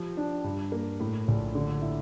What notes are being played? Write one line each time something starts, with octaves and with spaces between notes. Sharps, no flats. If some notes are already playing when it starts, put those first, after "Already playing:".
Already playing: F3 G4
D4
G2
A#3
A2
A#1
D3
E4